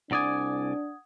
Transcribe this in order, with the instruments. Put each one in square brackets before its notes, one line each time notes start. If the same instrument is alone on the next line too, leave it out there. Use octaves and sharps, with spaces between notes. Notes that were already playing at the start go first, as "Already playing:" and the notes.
[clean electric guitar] C2 D5 G#5 [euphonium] D4 [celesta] F#5 D#6 G#6